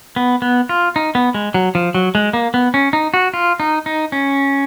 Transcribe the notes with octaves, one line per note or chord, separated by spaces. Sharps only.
B3
B3
F4
D#4
B3
G#3
F#3
F3
F#3
G#3
A#3
B3
C#4
D#4
F#4
F4
D#4
D#4
C#4